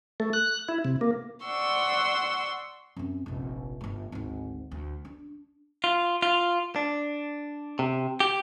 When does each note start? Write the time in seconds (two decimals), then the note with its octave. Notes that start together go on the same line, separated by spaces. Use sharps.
0.20 A3
0.33 F#6
0.68 E4
0.85 C3
1.01 A#3
1.46 D5 F#5 C6 C#6 E6
2.96 F#2 C4
3.26 F1 A#1
3.81 G1 A2
4.12 G#1 D2
4.72 D2
5.05 D4
5.84 F4
6.22 F4
6.76 D4
7.79 C3
8.20 G4